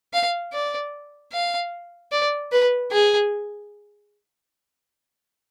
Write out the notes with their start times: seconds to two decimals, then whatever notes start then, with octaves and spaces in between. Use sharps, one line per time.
0.13 F5
0.53 D5
1.32 F5
2.12 D5
2.52 B4
2.92 G#4